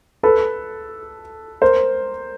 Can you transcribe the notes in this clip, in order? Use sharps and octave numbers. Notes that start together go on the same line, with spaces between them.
A4 B4
A#4 C5